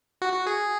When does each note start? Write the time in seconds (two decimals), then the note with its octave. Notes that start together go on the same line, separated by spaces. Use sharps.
0.22 F#4
0.34 F#4
0.47 G#4